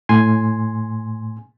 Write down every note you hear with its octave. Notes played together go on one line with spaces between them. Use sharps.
A2 G#5 C6